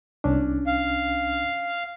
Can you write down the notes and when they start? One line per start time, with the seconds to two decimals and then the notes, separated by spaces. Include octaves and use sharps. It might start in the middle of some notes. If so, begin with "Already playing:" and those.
0.24 C2 C#4 D4
0.67 F5